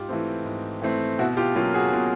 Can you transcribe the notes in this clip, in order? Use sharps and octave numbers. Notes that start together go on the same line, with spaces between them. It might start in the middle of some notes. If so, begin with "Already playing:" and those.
Already playing: G#2 F4 G4
E3 A3 C4
G#2
E3 A3 C4
B2 E4 F#4
F4 G4
F#3 A#3 C#4 F4 G4
F#4 G#4
B2 F4